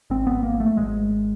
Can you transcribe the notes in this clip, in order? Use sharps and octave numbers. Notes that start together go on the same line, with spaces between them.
G#1 G#2 C4
B3
A#3
A3
G#1 G#2 G#3